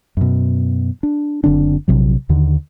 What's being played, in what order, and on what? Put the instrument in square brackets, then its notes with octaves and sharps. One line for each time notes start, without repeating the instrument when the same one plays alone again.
[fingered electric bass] F#2 B2
D4
F#1 D3 C4 D4
A#1 C3 F#3
D#2 D3 D#3